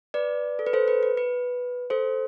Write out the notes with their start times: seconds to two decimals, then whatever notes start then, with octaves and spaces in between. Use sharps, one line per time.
0.14 B4 D5
0.59 A4
0.66 B4
0.73 A4 C5
0.88 B4
1.03 B4
1.17 B4
1.90 A4 C5